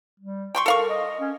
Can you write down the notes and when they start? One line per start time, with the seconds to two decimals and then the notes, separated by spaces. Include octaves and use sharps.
0.20 G3
0.55 G5 C6 C#6
0.66 A4 A#4 F5 C#6
0.90 D#5
1.20 C#4